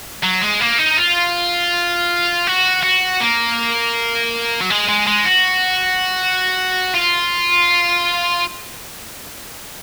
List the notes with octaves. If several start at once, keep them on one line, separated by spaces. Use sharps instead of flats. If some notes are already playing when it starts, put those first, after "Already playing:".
F#3
G#3
A#3
D#4
F4
F#4
F#4
A#3
F#3
G#3
G#3
G#3
F#4
F4